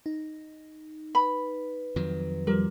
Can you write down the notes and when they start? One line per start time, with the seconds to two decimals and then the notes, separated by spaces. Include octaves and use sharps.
0.06 D#4
1.15 B4 B5
1.96 F2 D#3 F#3
2.47 F3 G3 A#4